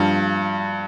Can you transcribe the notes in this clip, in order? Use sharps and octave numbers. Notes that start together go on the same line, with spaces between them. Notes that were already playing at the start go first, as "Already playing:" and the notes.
Already playing: G2 F3